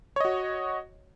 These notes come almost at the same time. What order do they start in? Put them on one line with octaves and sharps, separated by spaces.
C#5 D#5 F#4